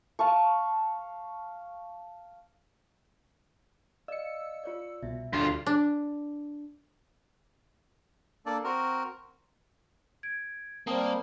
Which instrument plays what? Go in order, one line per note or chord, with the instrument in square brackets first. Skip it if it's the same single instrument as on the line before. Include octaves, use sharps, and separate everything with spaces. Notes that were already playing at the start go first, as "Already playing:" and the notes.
[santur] F5 A5 C#6
[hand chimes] D5 D#5 F5 [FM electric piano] E6 C#7
[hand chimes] F4 C#5 D5
[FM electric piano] C2 B2 [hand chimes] E5
[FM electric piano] D2 [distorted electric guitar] G2 F4 [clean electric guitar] D3 F3 C6 [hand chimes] F#4
[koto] D4
[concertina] A#3 D4 A4 D5
C4 F#4 A#4
[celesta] G#6 D7
[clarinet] G3 [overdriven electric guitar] A#3 [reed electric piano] C4 C5 [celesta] G5 A5 D#6